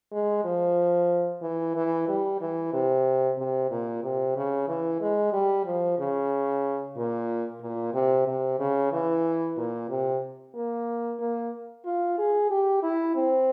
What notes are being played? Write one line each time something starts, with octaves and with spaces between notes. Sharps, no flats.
G#3
F3
E3
E3
G3
E3
C3
C3
A#2
C3
C#3
E3
G#3
G3
F3
C#3
A#2
A#2
C3
C3
C#3
E3
A#2
C3
A#3
A#3
F4
G#4
G4
E4
C4